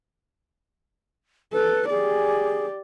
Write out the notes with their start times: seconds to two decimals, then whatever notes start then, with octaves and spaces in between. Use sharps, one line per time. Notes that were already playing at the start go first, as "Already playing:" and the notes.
1.53 A4 B4
1.90 G4 G#4 D5